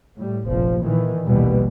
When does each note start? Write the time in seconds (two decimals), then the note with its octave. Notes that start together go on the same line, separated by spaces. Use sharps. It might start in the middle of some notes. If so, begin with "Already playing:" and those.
0.16 A2 G3
0.46 F1 A#1 F3
0.82 A#2 D#3 E3
1.27 A#1 D#2 B2 D3 E3 G3